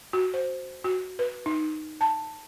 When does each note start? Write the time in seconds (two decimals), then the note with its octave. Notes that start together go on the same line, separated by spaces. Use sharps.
0.13 F#4
0.34 C5
0.84 F#4
1.19 B4
1.46 D#4
2.01 A5